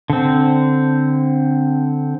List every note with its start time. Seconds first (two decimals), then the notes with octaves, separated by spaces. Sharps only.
0.10 D3 C4